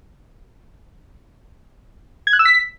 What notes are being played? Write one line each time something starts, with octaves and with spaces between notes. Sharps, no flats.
G#6
F#6
E6
B6